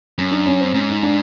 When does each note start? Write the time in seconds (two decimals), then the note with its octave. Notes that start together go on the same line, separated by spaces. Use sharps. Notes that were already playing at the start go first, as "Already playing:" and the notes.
0.18 F#2 C#4
0.32 D4
0.46 C#4
0.60 C4
0.74 G#2 C#4
0.89 D#4
1.03 D4